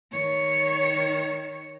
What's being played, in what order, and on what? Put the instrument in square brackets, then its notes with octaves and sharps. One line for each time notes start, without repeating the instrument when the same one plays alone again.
[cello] D#3 C#5